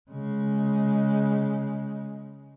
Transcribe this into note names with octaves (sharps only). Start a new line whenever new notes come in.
C#3 G#3